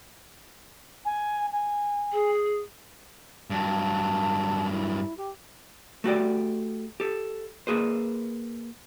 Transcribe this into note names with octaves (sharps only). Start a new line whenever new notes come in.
G#5
G#5
G#4
G2 F#3 A5
E4
G4
A3 F#4 G4 D5
G4 A4
A#3 G#4 B4 C5